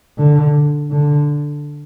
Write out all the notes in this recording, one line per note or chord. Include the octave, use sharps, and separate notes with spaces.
D3
D3